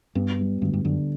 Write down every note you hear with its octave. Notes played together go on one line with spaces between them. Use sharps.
G2 B3
G3
D2 G2
G2
F#2 D3